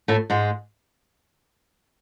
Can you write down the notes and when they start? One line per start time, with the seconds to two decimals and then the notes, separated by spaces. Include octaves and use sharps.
0.08 A2 A3
0.30 G#2 G#3